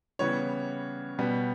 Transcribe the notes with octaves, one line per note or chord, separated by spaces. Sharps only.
C#3 E3 G3 B3 C#5
B2 G3 B3